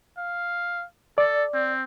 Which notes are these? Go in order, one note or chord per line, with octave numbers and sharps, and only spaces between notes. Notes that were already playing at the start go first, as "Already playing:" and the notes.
F5
A4 D5
C4